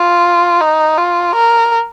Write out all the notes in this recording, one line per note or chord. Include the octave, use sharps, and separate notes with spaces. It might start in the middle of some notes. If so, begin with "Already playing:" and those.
Already playing: F4
D#4
F4
A#4